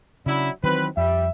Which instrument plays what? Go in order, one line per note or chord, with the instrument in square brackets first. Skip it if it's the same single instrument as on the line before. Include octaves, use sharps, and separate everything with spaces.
[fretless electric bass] C#3 [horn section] F#3 D4 E4
[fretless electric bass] D#3 E3 F#3 [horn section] C4 B4
[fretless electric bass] F2 [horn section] G3 [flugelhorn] E5